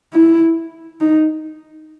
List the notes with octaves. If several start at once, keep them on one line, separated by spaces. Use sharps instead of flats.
E4
D#4